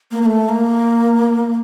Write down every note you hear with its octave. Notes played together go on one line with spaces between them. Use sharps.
A#3
A#3
A3
A#3